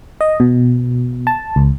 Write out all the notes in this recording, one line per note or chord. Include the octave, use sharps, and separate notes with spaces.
D#5
B2
A5
C#2